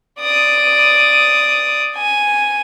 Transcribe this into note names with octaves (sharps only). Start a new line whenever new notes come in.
D5 D#6
G#5